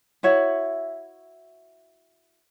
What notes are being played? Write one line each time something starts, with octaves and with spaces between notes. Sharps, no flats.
E4 F#4 C#5 E5